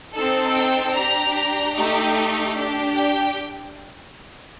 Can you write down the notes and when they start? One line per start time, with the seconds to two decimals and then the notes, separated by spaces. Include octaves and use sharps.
0.14 C4 D#4 A4
0.54 G5
0.94 D4 G4 A#5
1.35 A#5
1.75 A3 D#4 G4
2.57 D4 G4
2.97 G5